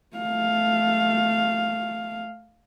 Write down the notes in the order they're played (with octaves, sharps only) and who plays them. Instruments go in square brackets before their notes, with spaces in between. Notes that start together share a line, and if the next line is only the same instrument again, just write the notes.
[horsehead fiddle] A3 F5